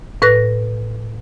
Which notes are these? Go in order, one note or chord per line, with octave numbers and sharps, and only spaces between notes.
A2 B4 F#6 A#6